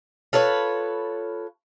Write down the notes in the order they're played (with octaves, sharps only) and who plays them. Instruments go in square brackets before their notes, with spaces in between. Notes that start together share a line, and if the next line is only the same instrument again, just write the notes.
[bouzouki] F4 A4 B4 C#5